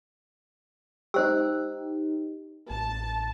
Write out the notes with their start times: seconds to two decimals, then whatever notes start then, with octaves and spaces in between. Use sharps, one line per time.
1.14 D#4 G4 C5 E6
2.70 A1 A5